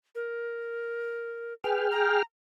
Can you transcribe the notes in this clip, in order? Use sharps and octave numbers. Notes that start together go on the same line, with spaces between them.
A#4
G#4 B4 G5 F6
A#5